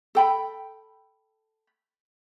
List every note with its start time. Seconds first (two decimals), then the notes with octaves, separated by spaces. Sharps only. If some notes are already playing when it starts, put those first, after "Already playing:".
0.15 A4 G5 B5